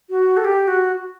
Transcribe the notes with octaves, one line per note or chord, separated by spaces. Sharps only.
F#4
A4
G4
F#4